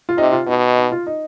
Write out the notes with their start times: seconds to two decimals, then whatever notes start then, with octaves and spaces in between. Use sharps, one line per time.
0.09 F4
0.18 C3 D#4
0.32 F4
0.47 B2 D#4
0.78 D#4
0.92 F4
1.07 D#4